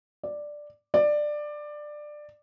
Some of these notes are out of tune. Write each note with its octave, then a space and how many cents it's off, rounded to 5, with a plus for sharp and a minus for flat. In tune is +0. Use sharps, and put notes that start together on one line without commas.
D5 +5
D5 +15